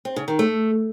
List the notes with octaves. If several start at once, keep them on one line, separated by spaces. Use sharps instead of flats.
C4
C#3
D#3
A3